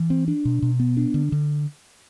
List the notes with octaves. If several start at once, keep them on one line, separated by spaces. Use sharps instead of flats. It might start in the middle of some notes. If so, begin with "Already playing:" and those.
Already playing: E3
C4
D4
B2
B2
B3
D4
D3
D3